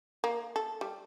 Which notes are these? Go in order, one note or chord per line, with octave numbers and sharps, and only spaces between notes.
A#3
A4
G3